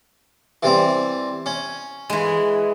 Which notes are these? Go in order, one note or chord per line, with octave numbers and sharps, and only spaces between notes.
E3 G3 C4
C#4
E3 G#3